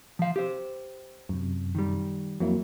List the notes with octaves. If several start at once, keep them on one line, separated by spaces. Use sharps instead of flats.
F3 F5
G4 C5
F#2 C3
D#3 G3
F2 F#3 A#3 E4